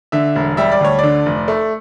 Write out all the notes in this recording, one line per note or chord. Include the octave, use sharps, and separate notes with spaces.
D3 E5
E1
G3 E5
D5
D2 C#5
D3 D5
F1
A3